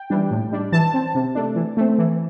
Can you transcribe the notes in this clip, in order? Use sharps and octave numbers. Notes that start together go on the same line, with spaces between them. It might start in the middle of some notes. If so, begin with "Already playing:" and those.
Already playing: G5
E3 G3 D4
A2
G3 D4
E3 A5
C4
C3
A3 D4
E3
A3 C4
E3